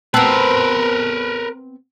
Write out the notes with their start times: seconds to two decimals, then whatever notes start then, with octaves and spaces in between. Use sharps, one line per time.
0.14 B3 C4 A#4 B4 A5 E6